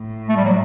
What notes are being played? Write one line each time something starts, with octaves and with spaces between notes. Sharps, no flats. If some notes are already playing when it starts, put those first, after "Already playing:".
Already playing: A2
A3
G3
F#3